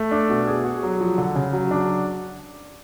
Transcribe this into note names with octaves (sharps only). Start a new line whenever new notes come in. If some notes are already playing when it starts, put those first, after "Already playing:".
Already playing: A3
D4
B2
G#4
F#4
F#3
F3
D3
C#3
F#3
D4